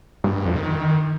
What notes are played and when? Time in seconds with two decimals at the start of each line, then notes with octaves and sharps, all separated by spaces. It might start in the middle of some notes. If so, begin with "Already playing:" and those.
0.24 G2
0.35 G2
0.45 F2
0.56 D#3